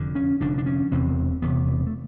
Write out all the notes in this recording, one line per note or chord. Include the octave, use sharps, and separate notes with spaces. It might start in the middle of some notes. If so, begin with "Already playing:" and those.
Already playing: F1 F2 D3
C#4
F1 F2 D3 D4
D4
C#4
E1 E2 C3 C4
E1 E2 C3 B3
B3
A3